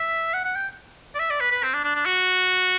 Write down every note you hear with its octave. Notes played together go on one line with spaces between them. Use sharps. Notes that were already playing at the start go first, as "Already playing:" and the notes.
Already playing: E5
F#5
F#5
G5
D5
E5
D5
B4
B4
C4
D4
D4
D4
F#4